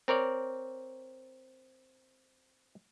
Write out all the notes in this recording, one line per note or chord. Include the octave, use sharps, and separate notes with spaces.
C4 A#4 C#5 D5